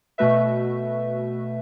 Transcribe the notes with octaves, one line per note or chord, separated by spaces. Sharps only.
B2 A3 F#4 B4 E5